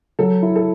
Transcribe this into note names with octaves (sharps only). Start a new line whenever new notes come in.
F#3 A4
E4
A4